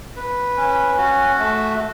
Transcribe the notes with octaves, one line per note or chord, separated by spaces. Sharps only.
B4
C#4
F#4
A3